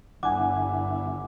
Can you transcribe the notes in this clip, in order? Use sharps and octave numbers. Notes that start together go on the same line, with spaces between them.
G1 D3 E4 F#5 G#5 D6